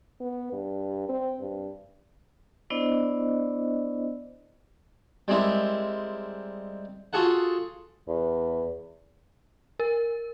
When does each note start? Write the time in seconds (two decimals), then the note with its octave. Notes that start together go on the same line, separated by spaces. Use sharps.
0.21 B3
0.53 G2
1.09 C4
1.40 G2
2.70 B3 D4 E4 C5 D5 D#5
5.28 G3 G#3 C4 E4 A#4
7.13 F4 F#4 G#4 A4 F#5
8.08 E2
9.80 A#4